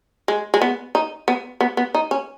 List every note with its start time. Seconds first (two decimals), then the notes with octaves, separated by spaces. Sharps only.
0.28 G#3
0.54 G#3
0.62 B3
0.95 D#4
1.28 B3
1.61 B3
1.77 B3
1.94 D#4
2.11 C#4